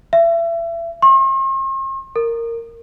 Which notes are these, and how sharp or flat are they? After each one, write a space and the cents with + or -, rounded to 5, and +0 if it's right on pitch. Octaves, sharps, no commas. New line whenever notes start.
E5 +30
C6 +45
A#4 -15